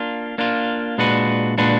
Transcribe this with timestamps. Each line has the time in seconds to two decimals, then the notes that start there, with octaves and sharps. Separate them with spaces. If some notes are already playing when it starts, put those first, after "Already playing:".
Already playing: A#3 D4 F4
0.38 A#3 D4 F4
0.98 A#2 G#3 D4 F#4 B4
1.58 A#2 G#3 D4 F#4 B4